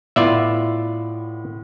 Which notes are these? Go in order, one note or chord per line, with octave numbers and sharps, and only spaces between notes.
A2 B3 F4 D5 E5